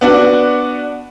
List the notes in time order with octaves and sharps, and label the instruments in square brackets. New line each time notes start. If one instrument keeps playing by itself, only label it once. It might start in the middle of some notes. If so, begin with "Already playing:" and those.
[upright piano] B3 D4 F#4